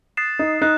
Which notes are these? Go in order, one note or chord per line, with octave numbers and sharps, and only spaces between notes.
D#6 F#6 A6 C7 E7
D#4
D#4 F#6 C7